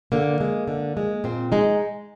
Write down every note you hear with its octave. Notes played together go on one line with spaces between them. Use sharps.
D3 A#3
G#3
D3
G#3
A#2 C4
G#3 D#4